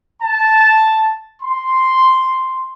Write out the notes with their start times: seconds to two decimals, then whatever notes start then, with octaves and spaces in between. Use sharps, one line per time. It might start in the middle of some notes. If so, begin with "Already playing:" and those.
0.22 A5
1.41 C6